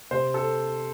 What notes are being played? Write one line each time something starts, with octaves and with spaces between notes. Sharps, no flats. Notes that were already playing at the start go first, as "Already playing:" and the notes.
C3 C5
A4